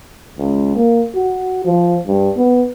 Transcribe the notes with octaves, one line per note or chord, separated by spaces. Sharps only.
C#2
A#3
F#4
F3
G2
B3